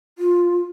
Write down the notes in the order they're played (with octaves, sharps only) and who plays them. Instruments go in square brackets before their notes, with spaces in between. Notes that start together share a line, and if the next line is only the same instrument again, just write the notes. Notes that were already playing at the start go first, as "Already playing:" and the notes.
[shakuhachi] F4